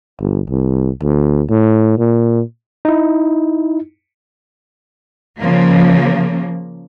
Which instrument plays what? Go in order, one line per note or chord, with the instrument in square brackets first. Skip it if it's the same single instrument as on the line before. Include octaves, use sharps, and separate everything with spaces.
[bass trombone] G1
C2
D2
A2
A#2
[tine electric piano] D#4 E4
[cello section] C#3 F3 A#3